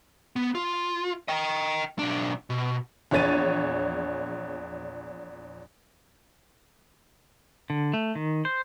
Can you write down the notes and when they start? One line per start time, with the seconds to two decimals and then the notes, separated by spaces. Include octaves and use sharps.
0.36 B3
0.55 F4
1.28 D#5 G5
1.99 B1 D4
2.50 B2
3.11 A#1 E2 C#5 A6 D#7
7.70 D3
7.94 A3
8.15 D#3
8.45 C5